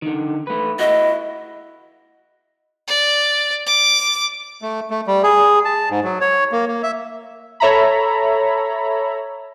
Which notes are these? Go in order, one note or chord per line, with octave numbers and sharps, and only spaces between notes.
D3 D#3
A3 B4
E4 F#4 D#5
D5
D6
A3
A3
G3
G#4
A5
G#2
F#3
C#5
A#3
A#3
E5
A4 C#5 E5 A#5 B5